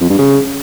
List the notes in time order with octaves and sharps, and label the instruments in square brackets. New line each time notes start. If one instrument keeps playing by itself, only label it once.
[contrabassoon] F2
G2
C#3